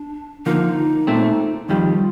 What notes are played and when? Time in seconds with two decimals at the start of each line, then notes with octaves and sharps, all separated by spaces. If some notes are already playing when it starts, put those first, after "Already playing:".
Already playing: D4
0.46 D3 F3 A#3 D#4
1.07 A#2 A3 C4
1.69 F2 D#3 G3 F4